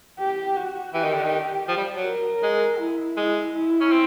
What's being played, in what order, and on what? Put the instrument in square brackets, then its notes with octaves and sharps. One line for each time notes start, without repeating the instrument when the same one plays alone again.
[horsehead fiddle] G4
F#4
[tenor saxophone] E3 [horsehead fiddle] G4
[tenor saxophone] D#3
D3
D#3
F3
G3
F#3
[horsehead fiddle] A#4
[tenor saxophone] G#3
[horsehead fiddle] E4
[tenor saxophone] G#3
[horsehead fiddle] E4
[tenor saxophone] C#4
C4